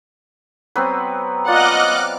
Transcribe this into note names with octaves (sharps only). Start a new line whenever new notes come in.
F#3 B3 C4 B4
F4 D5 D#5 F#5 D6 F6 F#6